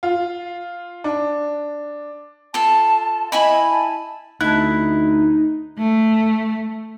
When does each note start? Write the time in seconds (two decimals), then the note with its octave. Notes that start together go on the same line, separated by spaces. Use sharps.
0.03 F4
1.04 D4
2.54 F4 A4 A5
3.32 E4 D#5 G#5 B5
3.71 A5
4.41 D2 D#4 E4 A5 F#6
5.78 A3